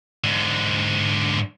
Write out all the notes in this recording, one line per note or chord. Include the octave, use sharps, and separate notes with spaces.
G#2 D3